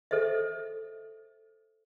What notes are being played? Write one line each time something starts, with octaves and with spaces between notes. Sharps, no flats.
A4 C5 D#5 E5